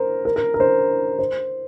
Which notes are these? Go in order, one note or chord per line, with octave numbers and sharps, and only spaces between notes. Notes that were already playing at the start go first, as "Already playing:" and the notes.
Already playing: A#4 C5
A#4
A#4
A#4
C5
C5